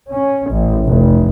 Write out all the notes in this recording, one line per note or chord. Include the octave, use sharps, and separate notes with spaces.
C#4
A1
F1